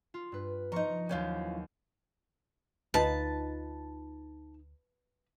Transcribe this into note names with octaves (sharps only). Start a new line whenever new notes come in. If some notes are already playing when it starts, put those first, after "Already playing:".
F4
G2 B4
F3 D#4 A#5 C#6
D#2 E3 F#3 C#4 F4 G6
D2 D#4 F4 B4 A5